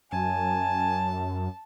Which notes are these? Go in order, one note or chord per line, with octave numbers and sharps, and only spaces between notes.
F#2 G#5 A5